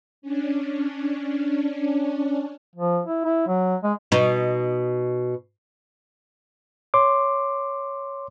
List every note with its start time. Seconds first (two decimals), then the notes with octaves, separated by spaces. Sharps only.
0.22 C#4 D4
2.76 F3
3.07 E4
3.25 E4
3.48 F#3
3.83 G#3
4.12 B2 D#4
6.94 C#5 C6 D6